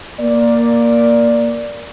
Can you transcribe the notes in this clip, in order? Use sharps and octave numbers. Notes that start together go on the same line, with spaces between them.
A#3 D5